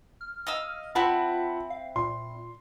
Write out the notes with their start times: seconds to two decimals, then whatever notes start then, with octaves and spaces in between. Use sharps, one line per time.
0.21 F6
0.47 D#5 F5 E6
0.95 C4 E4 F4 B4 F#5 A5
1.70 F5
1.96 A#2 C6